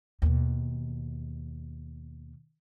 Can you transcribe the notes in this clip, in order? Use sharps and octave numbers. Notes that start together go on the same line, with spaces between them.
D#2 B2